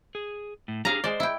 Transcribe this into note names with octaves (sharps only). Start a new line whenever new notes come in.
G#4
A2
D4 G4 G#4 F5 A#5
G#3 C5 D5
E4 G5